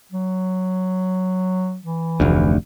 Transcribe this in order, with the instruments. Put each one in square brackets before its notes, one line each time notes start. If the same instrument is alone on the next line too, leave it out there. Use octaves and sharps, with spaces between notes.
[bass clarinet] F#3
E3
[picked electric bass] F1 D2